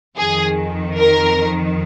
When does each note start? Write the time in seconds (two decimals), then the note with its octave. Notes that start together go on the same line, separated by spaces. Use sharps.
0.17 F2 D#3 G#4
0.98 A#4